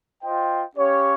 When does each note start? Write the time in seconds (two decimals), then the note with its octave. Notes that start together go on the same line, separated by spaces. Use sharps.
0.23 F4 C5 D#5 G5
0.76 C#4 G4 C#5 F5